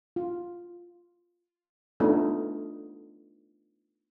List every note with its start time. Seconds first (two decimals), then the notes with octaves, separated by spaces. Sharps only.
0.16 F4
2.00 A3 B3 D4 D#4 F4 A4